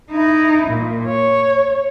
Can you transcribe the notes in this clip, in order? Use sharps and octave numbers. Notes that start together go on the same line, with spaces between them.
D#4 E4
A#2
C#5